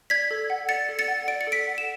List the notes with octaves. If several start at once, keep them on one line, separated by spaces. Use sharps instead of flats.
D5 G#6 B6
A4
F#5
D5 A6 C#7
A4
A6 C#7
F#5
D5 D7
C#7
A4
B6 D7
F#5
E7